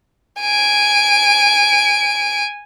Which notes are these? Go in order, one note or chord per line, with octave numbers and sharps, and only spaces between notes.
G#5 D7